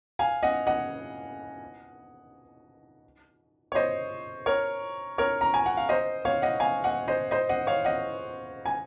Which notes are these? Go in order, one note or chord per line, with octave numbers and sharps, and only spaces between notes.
F5 G#5
D#5 F#5
D#5 F#5
C#5
C5 D#5
A#4 C#5
A#4 C#5
A#5
G#5
F#5
F5
C5 D#5
C#5 F5
D#5 F#5
F5 G#5
D#5 F#5
C5 D#5
C5 D#5
D#5 F#5
C#5 F5
D#5 F#5
G#5